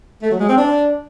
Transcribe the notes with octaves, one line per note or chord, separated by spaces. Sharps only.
A3
F#3
G#3
C4
D4